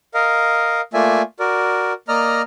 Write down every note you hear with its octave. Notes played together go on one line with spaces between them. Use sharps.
A#4 D#5 F5
A3 A#3 F4 D5 E5 G#5
F#4 A#4 D5
A#3 D5 D#5 A#5 F6